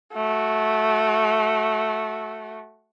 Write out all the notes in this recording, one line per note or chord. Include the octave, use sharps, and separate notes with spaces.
A3 F#4